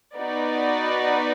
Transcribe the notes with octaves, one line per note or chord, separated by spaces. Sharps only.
B3 D#4 F#4 B4 D5